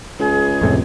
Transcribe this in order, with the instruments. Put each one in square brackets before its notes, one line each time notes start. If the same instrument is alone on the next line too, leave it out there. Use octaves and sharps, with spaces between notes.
[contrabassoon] C#2 [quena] G#4
[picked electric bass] F2 A2 C3